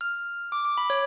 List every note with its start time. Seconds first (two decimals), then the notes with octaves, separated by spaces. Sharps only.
0.01 F6
0.52 D6
0.65 D6
0.77 B5
0.90 C#5